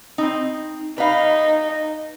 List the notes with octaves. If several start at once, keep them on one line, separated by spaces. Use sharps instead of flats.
C4 D#4
D#4 B4 F5